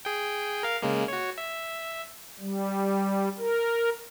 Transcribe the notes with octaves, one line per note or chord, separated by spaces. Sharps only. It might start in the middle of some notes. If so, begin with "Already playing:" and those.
G#4 G5
A#4 F5
C#3 G#3 A#3
F#4 C#5
E5
G3
A#4